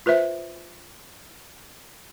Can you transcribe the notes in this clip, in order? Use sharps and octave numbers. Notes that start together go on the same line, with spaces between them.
F4 B4 C5 E5